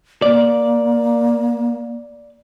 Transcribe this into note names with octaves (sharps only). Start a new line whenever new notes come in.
A#3 D5